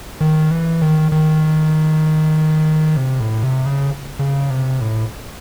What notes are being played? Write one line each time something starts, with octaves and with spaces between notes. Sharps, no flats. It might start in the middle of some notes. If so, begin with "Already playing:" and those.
D#3
E3
D#3
D#3
C3
A2
C3
C#3
C#3
C3
A2